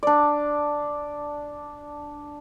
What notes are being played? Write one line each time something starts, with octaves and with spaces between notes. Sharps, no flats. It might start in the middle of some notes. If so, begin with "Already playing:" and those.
D4 D5